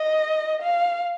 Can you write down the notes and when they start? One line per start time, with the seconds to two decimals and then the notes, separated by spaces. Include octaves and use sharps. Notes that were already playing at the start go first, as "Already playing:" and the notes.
Already playing: D#5
0.62 F5